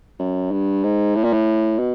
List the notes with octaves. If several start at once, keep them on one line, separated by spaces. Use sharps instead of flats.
F#2
G2
G#2
A2
A#2
A2
B2